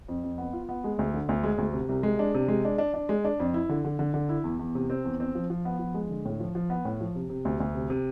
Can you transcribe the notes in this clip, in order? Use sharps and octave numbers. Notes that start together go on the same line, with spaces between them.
F2
F2
B3
F4
B3
G#3
D2
D3
D2
G#3
D2
C3
C2
G#3
D4
C3
G#3
D4
D4
D4
G#3
D4
F2
E4
D3
D3
D3
D3
E4
E2
E2
C3
C4
E2
C4
F3
F3
B3
F3
G#3
D3
A2
F3
F3
B3
A2
F3
C3
C3
D2
D2
C3
C3